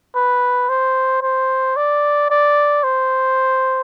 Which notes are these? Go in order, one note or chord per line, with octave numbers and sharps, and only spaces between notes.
B4
C5
C5
D5
D5
C5